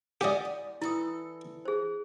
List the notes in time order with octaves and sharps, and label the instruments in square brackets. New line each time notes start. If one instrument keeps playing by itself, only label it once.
[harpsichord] G4 D#5 [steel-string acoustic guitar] D5 F#5 G#5
[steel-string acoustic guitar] E2
[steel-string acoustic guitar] E3 A4 [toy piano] E4 D#6
[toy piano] G#4 C5